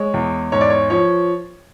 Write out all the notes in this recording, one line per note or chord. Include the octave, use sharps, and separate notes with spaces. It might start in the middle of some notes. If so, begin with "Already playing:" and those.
Already playing: G#3 C#5
E2
G#2 C#5
D5
C#5
F3 C#5